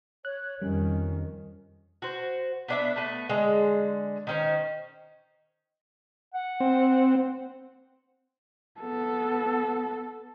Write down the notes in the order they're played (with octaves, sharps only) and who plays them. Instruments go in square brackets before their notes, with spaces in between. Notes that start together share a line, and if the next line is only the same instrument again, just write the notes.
[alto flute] C#5 [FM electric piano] F#6
[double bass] F2 D#3 [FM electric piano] G3 [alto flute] C#4
[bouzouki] F#4 C5
B3 D4 E5
A3 B3
D3 G#3
D#3 C#4 C5
[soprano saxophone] F#5
[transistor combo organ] C4
[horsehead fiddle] B3 A4